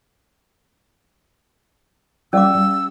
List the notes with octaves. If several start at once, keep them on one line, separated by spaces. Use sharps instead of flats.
G3 C#4 D5 F5 D6 E6
G3